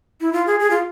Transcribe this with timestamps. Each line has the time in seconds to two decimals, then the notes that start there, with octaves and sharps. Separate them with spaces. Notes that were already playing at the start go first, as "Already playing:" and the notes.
0.20 E4
0.33 F4
0.47 G#4
0.60 G#4
0.70 F4